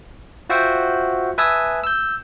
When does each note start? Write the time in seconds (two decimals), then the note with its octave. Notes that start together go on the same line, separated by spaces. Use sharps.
0.49 F4 F#4 C5 E5 F#5 G5
1.38 B4 E5 G#5 A5 D#6 E6
1.84 E6 G6